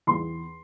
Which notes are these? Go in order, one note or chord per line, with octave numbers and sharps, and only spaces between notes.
E2 C6